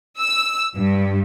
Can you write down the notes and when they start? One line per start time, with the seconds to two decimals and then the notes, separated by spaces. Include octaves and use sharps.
0.18 E6
0.76 G2